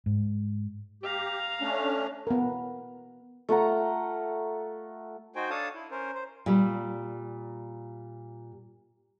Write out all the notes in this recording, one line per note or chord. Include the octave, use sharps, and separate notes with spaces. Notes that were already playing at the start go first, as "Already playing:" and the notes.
G#2
G4 F5 A#5
A3 C#4 D4
B3 A#4
A3 F4 F#5 A#5
D#4 F#4 C5 G5 G#5
D4 A4 C#5 F5 A5 D#6
E4
C#4 A#4 C5
C5
A#2 G3